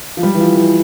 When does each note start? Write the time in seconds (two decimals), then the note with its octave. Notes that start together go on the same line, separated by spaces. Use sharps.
0.17 F3
0.23 G3
0.34 E3
0.40 F3
0.56 E3